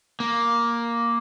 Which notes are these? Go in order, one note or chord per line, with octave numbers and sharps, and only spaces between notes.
A#3